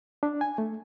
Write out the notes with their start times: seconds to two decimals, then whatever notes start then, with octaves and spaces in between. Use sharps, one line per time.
0.23 D4
0.41 G#5
0.58 A3